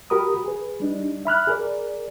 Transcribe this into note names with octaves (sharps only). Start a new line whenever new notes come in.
F#4 G4 A#4 B5 D#6
G#4 B4
G3 D4 D#4
E5 B5 F6 F#6
G#4 A#4 D5